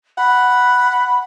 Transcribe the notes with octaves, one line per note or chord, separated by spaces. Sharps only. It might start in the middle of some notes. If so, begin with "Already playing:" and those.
F#5 B5